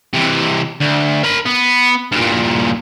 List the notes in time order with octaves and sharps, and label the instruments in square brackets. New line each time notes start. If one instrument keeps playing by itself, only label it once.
[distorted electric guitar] C3 E3
D2
A#4 B5
B3
G2 A#2